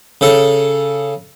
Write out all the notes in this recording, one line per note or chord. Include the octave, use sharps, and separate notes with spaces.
C#3 A4